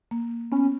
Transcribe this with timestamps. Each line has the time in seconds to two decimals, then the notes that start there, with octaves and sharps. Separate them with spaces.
0.11 A#3
0.52 B3 C#4